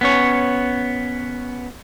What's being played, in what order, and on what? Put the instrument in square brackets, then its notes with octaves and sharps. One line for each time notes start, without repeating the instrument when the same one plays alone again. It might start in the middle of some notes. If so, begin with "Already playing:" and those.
[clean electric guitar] B3 C#4 C#5